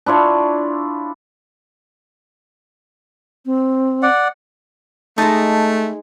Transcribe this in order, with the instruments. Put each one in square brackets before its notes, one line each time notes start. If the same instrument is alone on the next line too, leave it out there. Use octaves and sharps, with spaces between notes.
[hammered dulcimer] D4 E4 F4 C#5
[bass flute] C4
[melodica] D5 F#5
[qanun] G#3 D#4 [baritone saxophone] A3 [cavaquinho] A5 D#6